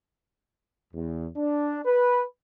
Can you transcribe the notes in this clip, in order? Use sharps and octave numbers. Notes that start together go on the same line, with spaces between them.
E2
D4
B4